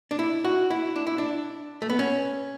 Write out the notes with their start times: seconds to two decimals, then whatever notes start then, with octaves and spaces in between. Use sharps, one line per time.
0.11 D4
0.19 E4
0.45 F#4
0.70 E4
0.96 D4
1.07 E4
1.18 D4
1.82 A3
1.90 B3
1.99 C#4